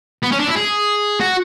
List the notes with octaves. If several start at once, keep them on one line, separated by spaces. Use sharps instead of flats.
B3
C#4
D4
E4
G#4
F#4